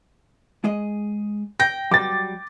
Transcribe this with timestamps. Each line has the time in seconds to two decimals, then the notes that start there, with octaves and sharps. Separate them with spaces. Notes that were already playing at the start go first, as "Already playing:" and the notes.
0.64 G#3 G#4 D#5
1.60 G5 A#6
1.91 F#3 G3 D6 A6